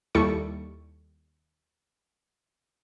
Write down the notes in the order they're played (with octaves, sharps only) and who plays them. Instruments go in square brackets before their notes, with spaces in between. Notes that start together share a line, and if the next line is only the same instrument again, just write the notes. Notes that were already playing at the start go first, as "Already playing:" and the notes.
[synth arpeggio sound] D#2 G3 E4 A4 C#6 C#7